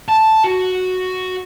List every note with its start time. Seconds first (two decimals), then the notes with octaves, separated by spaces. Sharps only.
0.09 A5
0.44 F#4